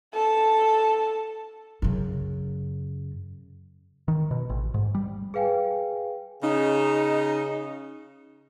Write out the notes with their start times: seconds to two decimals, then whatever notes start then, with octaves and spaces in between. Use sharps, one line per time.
0.14 A4 A5
1.82 F#2 C#3
4.08 D#3
4.31 B2
4.49 A1
4.74 G#2
4.95 G3
5.34 G#4 B4 F5 G5 G#5
6.43 C#3 D#4